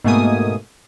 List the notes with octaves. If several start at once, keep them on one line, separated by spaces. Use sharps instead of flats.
G#2 B2 A3 A#3 G#5 D#6